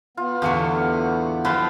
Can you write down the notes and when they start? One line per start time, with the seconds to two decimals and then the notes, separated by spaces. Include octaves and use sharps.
0.17 B3 F4
0.42 E2 A2 D3 G4 F5 C#6
1.45 F3 F#3 F4 B4 G5 D#6